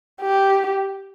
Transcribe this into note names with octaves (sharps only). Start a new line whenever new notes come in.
G4